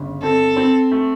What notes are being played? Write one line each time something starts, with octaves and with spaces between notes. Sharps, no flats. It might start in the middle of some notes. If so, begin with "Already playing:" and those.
Already playing: G1 C#3
C4 A4
C4
A3